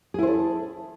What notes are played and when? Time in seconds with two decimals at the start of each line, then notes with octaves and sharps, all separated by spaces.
0.14 G#4
0.18 E4
0.23 C5
0.27 A4